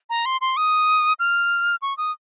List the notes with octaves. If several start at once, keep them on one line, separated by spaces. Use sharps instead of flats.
A#5
C6
C6
D#6
F6
C#6
D#6